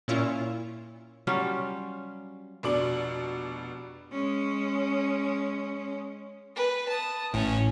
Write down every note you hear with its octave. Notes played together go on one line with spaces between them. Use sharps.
A#2 C#4 E4 F4
F#3 G3 C#4 F4
F1 B2 D4 D6 F#7
G#3 C#4
B4
A5 D#6
A1 A2 C#4